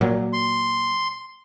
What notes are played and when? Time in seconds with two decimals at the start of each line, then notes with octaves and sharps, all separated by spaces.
0.01 A#2 F#3
0.33 C6